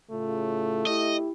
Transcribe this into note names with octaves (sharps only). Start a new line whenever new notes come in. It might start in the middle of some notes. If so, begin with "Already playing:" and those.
A2 C#3 A3 F4
E4 G4 D#5